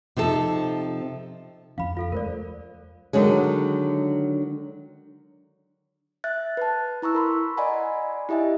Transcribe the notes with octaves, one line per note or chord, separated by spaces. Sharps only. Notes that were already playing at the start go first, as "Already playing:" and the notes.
C3 F3 D#4 A4
F2 F3 C#4 F5 B5
F4 A4 F5
E2 G#3 A3 A#4 C5 D5
D3 D#3 F#3 G#3
E5 F#6 A6
B4 A5
E4 A#5 C#6 E6
A#4 B5 C6
D5 D#5 F#5 G#5 A#5 B5
E4 G4 D#5 E5 G#5